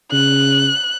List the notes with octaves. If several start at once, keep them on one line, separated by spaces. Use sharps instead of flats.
C#3 F#6